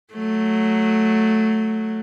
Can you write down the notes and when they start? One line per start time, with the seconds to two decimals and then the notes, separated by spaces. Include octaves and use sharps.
0.14 F#3 A3